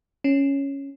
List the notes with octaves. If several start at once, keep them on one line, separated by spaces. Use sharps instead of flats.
C#4